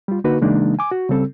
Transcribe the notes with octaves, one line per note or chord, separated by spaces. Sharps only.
G3 F4
D3 A#3 D#4 F#4 B4
C#3 E3 G#3 A#3 D4 D#4
G#5 D6
F#4
C#3 G3 C4 A4